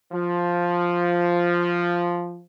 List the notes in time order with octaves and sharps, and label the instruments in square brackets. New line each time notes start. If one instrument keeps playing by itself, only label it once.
[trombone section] F3